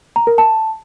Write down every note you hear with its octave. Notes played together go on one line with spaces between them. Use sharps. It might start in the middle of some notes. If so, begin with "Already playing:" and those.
A#5
A#4
A5